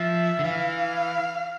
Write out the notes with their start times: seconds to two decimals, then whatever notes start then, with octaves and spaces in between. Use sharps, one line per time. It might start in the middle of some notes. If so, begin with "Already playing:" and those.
Already playing: F3 E5
0.39 D3
0.44 E3 F5